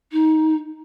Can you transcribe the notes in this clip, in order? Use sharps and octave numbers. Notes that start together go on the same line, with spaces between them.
D#4